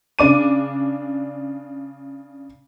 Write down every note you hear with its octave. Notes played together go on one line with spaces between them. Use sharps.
C#3 D4 D6 D#7